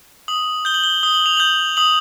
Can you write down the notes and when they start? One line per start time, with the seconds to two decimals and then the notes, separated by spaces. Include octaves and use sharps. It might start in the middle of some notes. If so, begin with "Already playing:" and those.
0.28 D#6 F#7
0.65 G6 G7
0.74 F#7
0.84 G7
1.03 D#6 G7
1.14 F#7
1.26 F7
1.37 G6 F#7
1.77 D#6 F#7